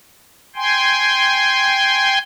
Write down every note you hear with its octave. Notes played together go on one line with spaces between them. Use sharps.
G5 G#5 C6